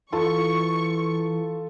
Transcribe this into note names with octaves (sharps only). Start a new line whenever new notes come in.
E3 F4 A4 C#6